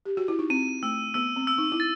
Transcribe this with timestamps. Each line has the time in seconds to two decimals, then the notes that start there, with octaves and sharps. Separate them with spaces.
0.05 G4
0.17 F#4
0.28 E4
0.39 D#4
0.50 C4 D#7
0.83 A3 E6
1.14 B3 E6
1.36 C4
1.47 E6
1.58 D#4
1.72 E4
1.80 A6